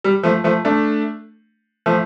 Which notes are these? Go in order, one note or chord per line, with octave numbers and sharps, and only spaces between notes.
G3
F3 A3
F3 A3
A3 D4
F3 A3